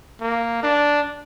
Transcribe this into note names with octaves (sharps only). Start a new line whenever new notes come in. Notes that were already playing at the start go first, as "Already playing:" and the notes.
A#3
D4